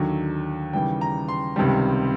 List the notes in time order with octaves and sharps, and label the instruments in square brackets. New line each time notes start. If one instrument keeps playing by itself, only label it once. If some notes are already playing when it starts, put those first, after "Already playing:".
Already playing: [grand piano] D#2 D3 F#3
D#2 C#3 E3 G3 G5
A#5
C6
C#2 C3 D#3 G3